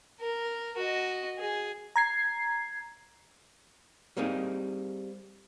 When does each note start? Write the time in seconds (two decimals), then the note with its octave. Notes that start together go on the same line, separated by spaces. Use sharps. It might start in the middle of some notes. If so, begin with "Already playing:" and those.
0.20 A#4
0.77 F#4 D#5
1.38 G#4
1.96 A#5 G#6 C7
4.17 G3 A#3 C4 D#4 G#4